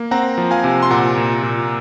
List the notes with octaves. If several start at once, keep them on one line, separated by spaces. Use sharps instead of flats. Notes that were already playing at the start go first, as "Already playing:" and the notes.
Already playing: A#3
C4 F#5 A#5
F3
F5 G#5
C3
C6
A#2 F#5 A#5
A#2
A#2